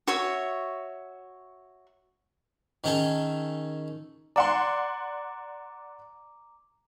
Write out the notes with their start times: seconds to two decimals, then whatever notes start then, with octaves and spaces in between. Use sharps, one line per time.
0.07 F#4 C#5 E5
2.84 D#3 C#4 D#4 G#4 A4
4.36 D5 F#5 A#5 C6 D6